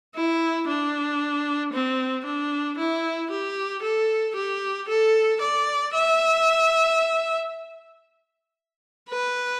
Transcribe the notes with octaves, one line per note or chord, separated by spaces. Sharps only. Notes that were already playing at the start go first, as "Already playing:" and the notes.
E4
D4
C4
D4
E4
G4
A4
G4
A4
D5
E5
B4